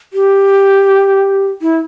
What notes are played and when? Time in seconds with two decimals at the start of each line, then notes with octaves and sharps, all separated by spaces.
0.13 G4
1.62 E4